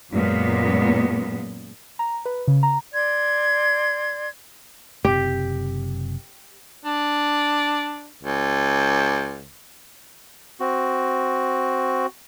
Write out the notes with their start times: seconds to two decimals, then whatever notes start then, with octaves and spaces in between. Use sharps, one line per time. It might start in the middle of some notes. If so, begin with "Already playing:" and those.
0.11 F#2 A#2 G#3 A#3 B3
1.99 A#5
2.25 B4
2.48 C#3
2.63 A#5
2.93 D5 C6 G#6
5.05 F#1 C3 C4 G4
6.85 D4
8.23 C#2
10.60 C4 F#4